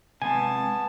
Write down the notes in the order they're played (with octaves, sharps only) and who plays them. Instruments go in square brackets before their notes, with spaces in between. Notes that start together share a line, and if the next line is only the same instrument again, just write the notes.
[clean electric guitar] C3 G#3 [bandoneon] B3 [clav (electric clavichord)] G#5 [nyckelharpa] A5